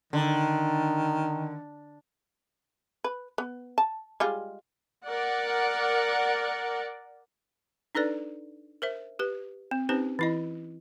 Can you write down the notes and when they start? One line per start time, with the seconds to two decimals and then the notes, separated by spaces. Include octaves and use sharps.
0.13 D3 D#3
3.04 B4
3.38 B3
3.78 A5
4.20 G3 G#3 F4
5.07 A#4 D5 F#5
7.95 D4 D#4 A4 B4 D5
8.82 A#4 C5 E5
9.19 G4 B4
9.71 C4
9.89 C4 C#4 D#4 G4 B4 C5
10.19 E3 E4 D#5